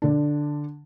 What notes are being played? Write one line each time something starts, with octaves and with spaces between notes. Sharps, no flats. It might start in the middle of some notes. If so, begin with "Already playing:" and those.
D3 D4